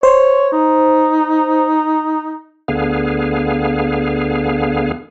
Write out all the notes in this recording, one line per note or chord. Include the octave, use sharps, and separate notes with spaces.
C5 C#5
D#4
D2 D3 B3 G#4 F5